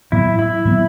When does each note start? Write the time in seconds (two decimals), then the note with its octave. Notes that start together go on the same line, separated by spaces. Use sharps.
0.12 A2 F#3 B3 E4
0.39 E4
0.65 A2 F#3 B3